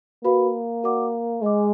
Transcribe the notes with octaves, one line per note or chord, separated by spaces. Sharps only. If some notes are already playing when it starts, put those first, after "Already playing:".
A#3 F#4 B4 F5 B5
F#4 A#4 D5 F#5 D6
G#3 G#4 D#5 G#5 D6